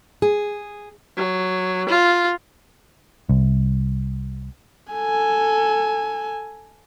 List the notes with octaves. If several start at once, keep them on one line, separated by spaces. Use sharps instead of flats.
G#4
F#3
F4
C2
A4 G#5